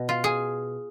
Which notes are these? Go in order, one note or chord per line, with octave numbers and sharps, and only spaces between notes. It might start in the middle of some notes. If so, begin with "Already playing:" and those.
Already playing: B2
F4
G#4